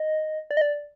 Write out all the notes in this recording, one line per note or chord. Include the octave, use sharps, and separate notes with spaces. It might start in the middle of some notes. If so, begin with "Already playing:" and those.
Already playing: D#5
D5
D#5
D5